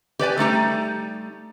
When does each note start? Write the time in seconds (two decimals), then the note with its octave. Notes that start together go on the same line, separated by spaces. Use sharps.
0.19 G4 B4 D5 G#5
0.37 G3 A3 D#4 G4